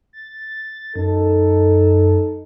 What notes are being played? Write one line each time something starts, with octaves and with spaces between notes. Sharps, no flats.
A6
F#2 D#4 A4